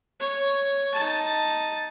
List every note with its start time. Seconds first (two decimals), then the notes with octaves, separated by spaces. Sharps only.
0.20 C#5
0.94 D#4 A5